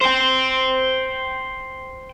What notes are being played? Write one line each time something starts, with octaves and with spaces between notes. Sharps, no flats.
C5 G5